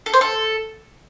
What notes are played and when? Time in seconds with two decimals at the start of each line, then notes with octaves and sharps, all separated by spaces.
0.06 A4
0.14 C5
0.21 A4